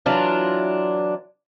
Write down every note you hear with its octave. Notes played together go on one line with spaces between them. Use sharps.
E3 F#3 D4 F4